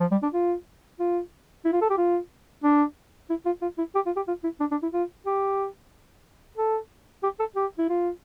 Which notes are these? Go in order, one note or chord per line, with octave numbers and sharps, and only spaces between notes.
F3
G3
D4
F4
F4
E4
F4
A4
G4
F4
D4
E4
F4
F4
E4
G4
F4
G4
F4
E4
D4
D4
E4
F4
G4
A4
G4
A4
G4
E4
F4